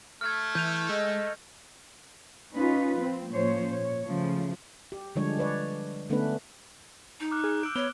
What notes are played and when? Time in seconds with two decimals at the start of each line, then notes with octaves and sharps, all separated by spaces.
0.21 A3 F6 G#6
0.55 E3 G6 D#7 F7
0.89 G#3 D#5
2.54 C#4 D#4 F4 B4
2.97 F3 C4
3.31 A2 F3 A#3 C#4 C5 C#5
3.69 A#2 C#5
4.07 C#3 F3 A3
4.92 G4
5.16 D3 F3 G3 G#3 D4 C#5
5.38 D3 B4 C#5 D5
6.10 D3 A3 B3 C#4 D4 B4
7.20 D#4
7.31 D6 F6 F#6
7.44 G#4 F6 F#6
7.63 E6 G6 D7
7.76 B3 C#5 G7